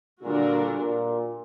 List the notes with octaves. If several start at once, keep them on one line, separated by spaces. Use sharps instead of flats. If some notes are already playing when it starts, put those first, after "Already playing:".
A#2 D3 G3 D4 F#4 A#4
A#2